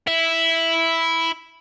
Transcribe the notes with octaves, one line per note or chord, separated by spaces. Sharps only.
E4